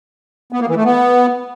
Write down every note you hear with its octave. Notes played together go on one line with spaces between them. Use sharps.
B3
A#3
E3
A3
B3